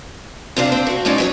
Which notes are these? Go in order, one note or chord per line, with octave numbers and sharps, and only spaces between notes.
C3 C4 D4 F5
C4
F#4
F2 G#3 C#4 D#4 D5
F#3 G4 C#5